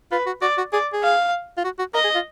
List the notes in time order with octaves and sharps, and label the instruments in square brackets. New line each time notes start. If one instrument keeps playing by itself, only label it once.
[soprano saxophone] F4 [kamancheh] B4
[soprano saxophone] F#4
[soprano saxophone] F#4 [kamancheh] D5
[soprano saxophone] F#4
[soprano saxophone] G#4 [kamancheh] D5
[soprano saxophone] G#4
[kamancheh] F5
[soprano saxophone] F4
F#4
F#4
[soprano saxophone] A#4 [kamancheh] D#5
[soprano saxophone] G#4
F4